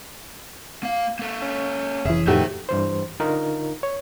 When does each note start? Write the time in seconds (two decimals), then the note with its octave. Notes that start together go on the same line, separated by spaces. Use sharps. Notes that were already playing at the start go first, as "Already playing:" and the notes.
0.83 A#3 F5
1.19 A#3 A4
1.42 C#4
2.05 F1 E3 G#4 E5
2.27 F2 A2 D#3 A3 F#4 G4 C5 E5
2.69 G2 E3 C5
3.20 D3 D#4 F4 A#4
3.83 C#5